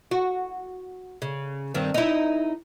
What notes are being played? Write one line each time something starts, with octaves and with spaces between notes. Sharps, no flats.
F#4
C#3
G2 D#3 C4
D#4 E4